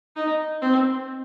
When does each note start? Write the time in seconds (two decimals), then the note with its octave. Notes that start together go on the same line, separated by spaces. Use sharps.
0.16 D#4
0.62 C4